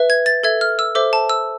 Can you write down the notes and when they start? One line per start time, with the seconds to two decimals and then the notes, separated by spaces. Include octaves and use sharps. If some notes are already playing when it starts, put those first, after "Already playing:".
Already playing: B4 E5
0.10 G#6
0.26 A6
0.43 A4 E5 G#6
0.61 F6
0.79 E6
0.95 A4 C5 E5 D6
1.13 A5
1.30 E6